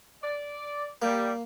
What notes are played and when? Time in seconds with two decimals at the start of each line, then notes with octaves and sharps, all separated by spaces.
0.23 D5
1.02 G3 A#3